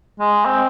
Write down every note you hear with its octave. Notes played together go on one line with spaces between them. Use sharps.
G#3
C4